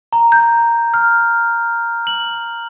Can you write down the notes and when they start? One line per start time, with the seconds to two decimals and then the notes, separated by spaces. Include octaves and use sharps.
0.13 A#5
0.32 G6
0.94 F6
2.07 F#7